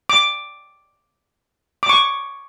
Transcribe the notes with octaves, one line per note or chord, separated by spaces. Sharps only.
D6
D6
C#6